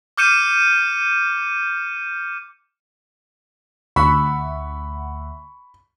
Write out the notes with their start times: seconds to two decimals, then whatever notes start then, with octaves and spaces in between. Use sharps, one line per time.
0.17 D6 F6 G6 C#7 D#7 E7
3.96 D2 E5 F#5 B5 C#6